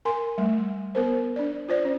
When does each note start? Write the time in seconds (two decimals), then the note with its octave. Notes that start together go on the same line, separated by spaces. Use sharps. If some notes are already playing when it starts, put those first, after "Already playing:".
0.05 A#4 G#5 C6
0.38 G3 A3
0.95 B3 A#4 C5
1.36 D4 D5
1.68 F4 C5 D5
1.85 C#4